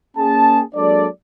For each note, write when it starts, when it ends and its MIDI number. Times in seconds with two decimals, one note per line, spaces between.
0.17 0.62 58
0.17 0.62 61
0.17 0.62 68
0.17 0.62 81
0.75 1.07 54
0.75 1.07 56
0.75 1.07 58
0.75 1.07 62
0.75 1.07 69
0.75 1.07 74